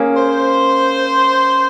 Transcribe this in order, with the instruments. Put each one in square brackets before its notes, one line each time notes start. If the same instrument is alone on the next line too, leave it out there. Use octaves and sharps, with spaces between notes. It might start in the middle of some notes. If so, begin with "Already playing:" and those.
Already playing: [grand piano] A#3 C#4 G#4
[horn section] C5